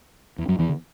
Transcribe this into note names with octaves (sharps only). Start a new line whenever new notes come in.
E2 E3
F#2 F#3
E2 E3
D3